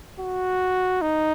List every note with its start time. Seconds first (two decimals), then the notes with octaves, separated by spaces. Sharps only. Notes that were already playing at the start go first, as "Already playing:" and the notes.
0.20 F#4
1.02 D#4